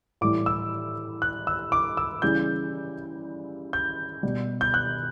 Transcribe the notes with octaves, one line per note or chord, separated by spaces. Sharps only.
A2 E3 G3 D6
E6
F#6
E6
D6
E6
C#3 E3 G3 G6
G6
B2 G3
G6
F#6